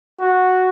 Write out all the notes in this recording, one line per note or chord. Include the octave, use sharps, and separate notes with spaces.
F#4